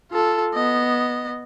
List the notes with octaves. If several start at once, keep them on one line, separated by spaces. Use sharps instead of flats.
F4 A4
B3 D#5